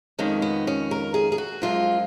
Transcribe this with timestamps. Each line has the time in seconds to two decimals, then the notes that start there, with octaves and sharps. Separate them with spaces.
0.19 F2 D#3 G#3 C#4
0.42 B3
0.67 C#4
0.91 A#4
1.14 G#4
1.32 G#4
1.38 F#4
1.62 F#2 F3 G#3 F4